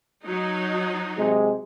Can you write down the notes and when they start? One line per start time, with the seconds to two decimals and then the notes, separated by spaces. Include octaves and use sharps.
0.24 F#3 D#4
1.17 C3 G#3